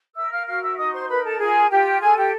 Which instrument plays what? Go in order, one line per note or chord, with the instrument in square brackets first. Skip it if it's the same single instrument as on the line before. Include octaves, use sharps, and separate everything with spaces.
[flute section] A#4 E5 E6
F5 F6
F#4 F5 F6
E5 E6
D#4 D#5 D#6
C5 C6
A#4 B4 B5
A4 A5
F4 G#4 G#5
F4 G4 G5
G#4 A4 G#5
G4 G5